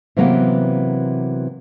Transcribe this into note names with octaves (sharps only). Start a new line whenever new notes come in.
C3 E3 F#3 A#3 B3